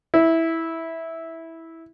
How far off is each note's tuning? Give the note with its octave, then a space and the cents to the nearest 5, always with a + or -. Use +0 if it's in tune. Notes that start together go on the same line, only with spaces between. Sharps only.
E4 -10